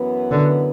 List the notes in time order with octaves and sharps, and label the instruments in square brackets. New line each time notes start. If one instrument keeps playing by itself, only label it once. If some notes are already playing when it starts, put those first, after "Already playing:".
Already playing: [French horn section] F#2 E3 B3
[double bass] D3